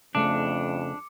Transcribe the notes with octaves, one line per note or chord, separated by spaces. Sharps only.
F2 C#3 A3 D4 D6 C#7